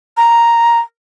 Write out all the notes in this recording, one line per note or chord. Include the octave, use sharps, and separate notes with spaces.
A#5